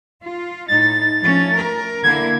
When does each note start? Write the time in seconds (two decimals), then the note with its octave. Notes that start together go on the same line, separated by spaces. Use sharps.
0.24 F4
0.68 A2 D#4 A6
1.20 F3 A3 C#4
1.53 A#4
2.03 D3 A#3 E4 G#6